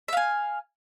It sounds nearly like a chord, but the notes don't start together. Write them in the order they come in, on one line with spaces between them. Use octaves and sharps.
E5 F5 G#5